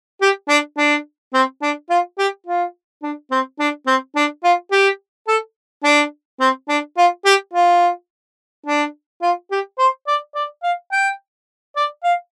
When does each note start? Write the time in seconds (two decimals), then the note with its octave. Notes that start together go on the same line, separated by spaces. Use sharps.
0.21 G4
0.49 D4
0.78 D4
1.34 C4
1.62 D4
1.90 F4
2.18 G4
2.46 F4
3.03 D4
3.31 C4
3.59 D4
3.87 C4
4.16 D4
4.44 F4
4.71 G4
5.28 A4
5.84 D4
6.40 C4
6.69 D4
6.97 F4
7.25 G4
7.53 F4
8.66 D4
9.22 F4
9.51 G4
9.78 C5
10.07 D5
10.35 D5
10.63 F5
10.92 G5
11.76 D5
12.04 F5